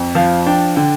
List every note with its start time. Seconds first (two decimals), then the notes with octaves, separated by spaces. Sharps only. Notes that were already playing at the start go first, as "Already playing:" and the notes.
Already playing: F2
0.15 F3 F5
0.46 D4 G5
0.76 D3 G5